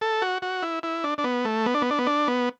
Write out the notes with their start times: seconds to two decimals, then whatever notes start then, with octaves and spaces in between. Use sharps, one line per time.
0.01 A4
0.22 F#4
0.42 F#4
0.63 E4
0.83 E4
1.04 D4
1.18 D4
1.24 B3
1.45 A3
1.66 B3
1.74 D4
1.82 B3
1.91 D4
1.99 B3
2.07 D4
2.27 B3